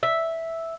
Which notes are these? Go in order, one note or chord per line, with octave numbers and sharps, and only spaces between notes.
E5